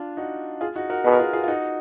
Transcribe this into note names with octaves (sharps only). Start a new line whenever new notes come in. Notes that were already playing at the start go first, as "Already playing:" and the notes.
Already playing: D4 F4
D#4 F#4
F4 G#4
D#4 F#4
F#4 A#4
B2 G#4 B4
A#4
F4 G#4
F4 G#4
F4
D#4 F#4